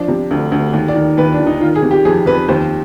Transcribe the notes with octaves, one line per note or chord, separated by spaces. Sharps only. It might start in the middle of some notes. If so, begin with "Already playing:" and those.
Already playing: F3 D4
C3
D2
D2
D#2
D5
D#3
D#2 B4
D4
D#3
D#4
D#3 F4
G#4
C3
G4
F2 G#4
F2 B4
D#2 C5